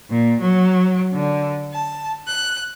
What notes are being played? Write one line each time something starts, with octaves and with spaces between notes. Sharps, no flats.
A#2
F#3
D3
A5
F#6